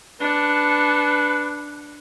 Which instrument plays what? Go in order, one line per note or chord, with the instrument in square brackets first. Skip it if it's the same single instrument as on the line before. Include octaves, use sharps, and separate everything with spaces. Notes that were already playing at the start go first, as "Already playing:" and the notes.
[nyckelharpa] D4 [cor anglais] B4 [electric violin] A5 C#7